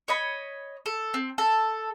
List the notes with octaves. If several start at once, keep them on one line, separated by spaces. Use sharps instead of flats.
C#5 D#5 B5
A4
C4
A4